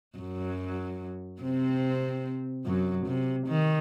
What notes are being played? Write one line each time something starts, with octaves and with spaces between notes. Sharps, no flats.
F#2 F#3
C3 C4
F#2 F#3
C3
D#3